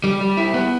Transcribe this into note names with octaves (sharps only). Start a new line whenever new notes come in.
G3
G3
E4
B3